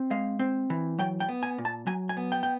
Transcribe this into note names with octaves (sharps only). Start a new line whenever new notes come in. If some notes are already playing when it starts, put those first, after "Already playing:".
Already playing: C4
G#3 F5
C4
E3
F#3 G5
G5
B3
G#5
A#2
A5
F#3 G#5
G#5
B3
G5
G5